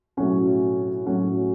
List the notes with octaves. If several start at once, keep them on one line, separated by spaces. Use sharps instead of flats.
A2 F#3 C#4 F#4
A2 F#3 C#4 F#4